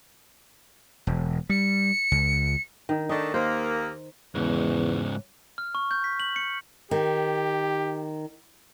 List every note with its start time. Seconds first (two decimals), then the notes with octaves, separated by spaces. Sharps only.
1.07 E1
1.49 G3 C#7
2.12 C#2
2.89 D#3
3.09 D#3 A3 D4 D#4
3.34 D#2 A#3 C5
4.35 E2 G#2 C#3
5.58 F6
5.75 C#6
5.91 G6
6.04 B6
6.20 F#7
6.36 C#7
6.91 D#3 G4